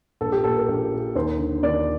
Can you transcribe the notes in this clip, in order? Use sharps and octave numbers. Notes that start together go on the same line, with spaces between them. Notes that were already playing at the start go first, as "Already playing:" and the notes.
A#1 A4
G4
A#2 A4
A#4
A#1
A#2
D#2 C5
D3
D#2 D5